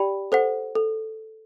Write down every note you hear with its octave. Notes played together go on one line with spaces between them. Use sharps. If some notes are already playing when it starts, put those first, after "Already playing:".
Already playing: G4 D5 G5 B5
A4 C5 F#5
A4